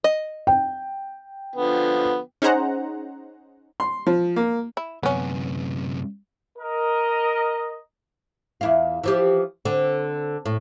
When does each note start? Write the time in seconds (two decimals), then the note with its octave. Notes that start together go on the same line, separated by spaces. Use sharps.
0.04 D#5
0.47 G5
1.55 D3 F3 B3
2.42 C#4 D#4 G#4 C5 F#5 A#5
3.80 C6
4.06 F3
4.36 A#3
4.77 E4
5.03 F#2 C3 B3 C#4
6.59 A#4 D#5
8.61 E2 E4 F4
9.04 E3 F3 G4
9.65 D3 C4
10.46 A2